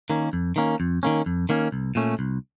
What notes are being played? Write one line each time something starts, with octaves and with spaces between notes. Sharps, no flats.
D#3 A#3 C#4
F2
D#3 A#3 C#4
F2
D#3 A#3 C#4
F2
D#3 A#3 C#4
C2
A#2 A3 C#4
C2